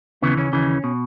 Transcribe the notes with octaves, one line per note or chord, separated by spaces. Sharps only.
D#2 C#3 E3 B3
C#3 C#4
D#2 C#3 E3
B2